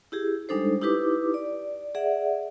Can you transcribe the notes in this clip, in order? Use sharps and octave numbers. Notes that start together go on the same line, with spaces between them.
E4 G4 G#4
G3 G#3 D4 D#4 A4 C5
D#4 E4 G4 B4 D6
D5
G#4 D5 E5 F#5